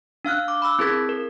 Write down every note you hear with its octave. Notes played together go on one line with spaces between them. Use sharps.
D4 F5 F6 F#6
D6
B5 D6 E6
C4 E4 G#4 A#4 G#6 B6
A#4